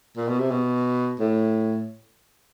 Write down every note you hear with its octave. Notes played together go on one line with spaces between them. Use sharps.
A#2
B2
C3
B2
A2